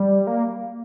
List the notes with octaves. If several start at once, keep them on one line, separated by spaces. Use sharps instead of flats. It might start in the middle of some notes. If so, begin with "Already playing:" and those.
Already playing: G3
A#3